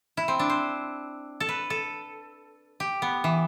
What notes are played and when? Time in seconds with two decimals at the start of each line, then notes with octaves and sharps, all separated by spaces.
0.17 E4
0.28 C4
0.39 D4
0.50 C5
1.40 A4
1.49 B4
1.70 A4
2.80 G4
3.02 B3
3.24 E3